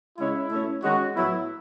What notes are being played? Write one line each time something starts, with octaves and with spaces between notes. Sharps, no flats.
C#3 G#3 C#4 E4
B2 A3 C#4
D#3 G#3 C#4 F#4
A2 F#3 B3 E4